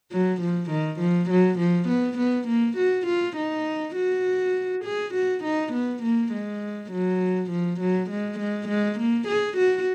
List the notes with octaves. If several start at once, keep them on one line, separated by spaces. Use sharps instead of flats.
F#3
F3
D#3
F3
F#3
F3
B3
B3
A#3
F#4
F4
D#4
F#4
G#4
F#4
D#4
B3
A#3
G#3
F#3
F3
F#3
G#3
G#3
G#3
A#3
G#4
F#4